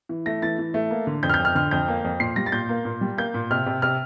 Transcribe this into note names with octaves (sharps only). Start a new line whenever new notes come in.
E3
A3 A#6
E3 A6
E3
A3
A#3
D3
F2 G6
F6
G6
F2
F6
D3 F6
F2 G6
A#3
F2
A#2 C7
G3 A#6
A6
A#2 G6
A#3
A#2
G3
A#3 G6
A#2
C3 F6
C3
C3 F6